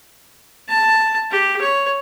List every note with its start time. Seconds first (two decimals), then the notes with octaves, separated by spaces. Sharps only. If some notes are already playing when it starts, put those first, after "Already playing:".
0.68 A5
1.31 G4
1.61 C#5